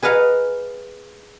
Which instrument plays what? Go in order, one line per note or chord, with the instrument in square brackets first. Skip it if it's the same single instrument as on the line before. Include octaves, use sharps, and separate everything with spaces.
[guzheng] G#4 B4 D#5 F5 F#5 A#5